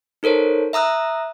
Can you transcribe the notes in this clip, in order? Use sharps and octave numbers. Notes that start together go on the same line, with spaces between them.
D#4 A4 A#4 C5 C#5
E5 A#5 D#6 E6 F#6